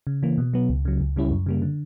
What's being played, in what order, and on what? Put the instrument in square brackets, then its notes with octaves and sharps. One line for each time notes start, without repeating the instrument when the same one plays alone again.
[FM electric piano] C#3
E3 A#3
B2
F#3 B3
C#2
C#3 F#3
C#2
C#3 G3 C#4 E4
F#2
C#3 G3 A#3
D3